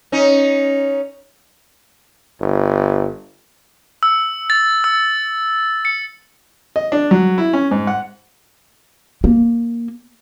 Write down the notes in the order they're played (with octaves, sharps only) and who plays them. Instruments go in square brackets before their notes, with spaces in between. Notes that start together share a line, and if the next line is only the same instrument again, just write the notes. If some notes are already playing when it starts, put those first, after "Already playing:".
[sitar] C#4 D#4
[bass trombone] G1
[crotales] E6
A6
E6
C#7
[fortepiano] D#5
D4
F#3
E4
C#4
G#2
F#5
[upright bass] A#3